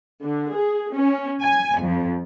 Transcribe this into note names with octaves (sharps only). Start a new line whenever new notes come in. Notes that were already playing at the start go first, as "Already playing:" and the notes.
D3
G#4
C#4
G#5
F2